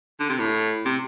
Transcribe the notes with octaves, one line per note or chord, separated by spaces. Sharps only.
D3
C3
A2
C3